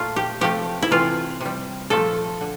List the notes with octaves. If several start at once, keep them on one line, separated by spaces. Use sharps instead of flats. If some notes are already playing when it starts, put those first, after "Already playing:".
Already playing: A#2 A3 F4
G4
C3 F3 A3 G4
E4
C3 E3 A3 F4
C3 G3
A#2 F3 A3 A4
D3